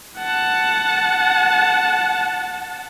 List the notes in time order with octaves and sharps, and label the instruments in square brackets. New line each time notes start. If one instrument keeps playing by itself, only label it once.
[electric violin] F#5 A5